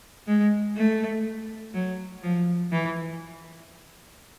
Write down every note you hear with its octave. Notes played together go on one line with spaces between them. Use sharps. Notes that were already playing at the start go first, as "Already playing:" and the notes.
G#3
A3
F#3
F3
E3